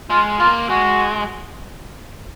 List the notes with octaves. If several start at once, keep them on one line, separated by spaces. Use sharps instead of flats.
G#3 F4
A#3 F4
G#3 F#4